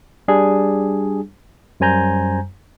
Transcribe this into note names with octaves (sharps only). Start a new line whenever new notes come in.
G3 D4 G#4
F#2 G3 C5 G#5 A#5 G6